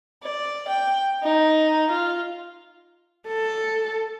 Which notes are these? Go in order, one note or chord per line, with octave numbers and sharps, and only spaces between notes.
D5
G5
D#4
F4
A4